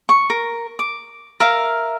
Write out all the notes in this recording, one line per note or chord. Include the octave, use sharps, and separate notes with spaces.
C#6
A#4
D6
A#4 E5 F5